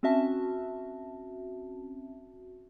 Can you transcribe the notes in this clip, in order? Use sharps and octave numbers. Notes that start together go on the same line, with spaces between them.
C4 C#4 F#4 E5 A5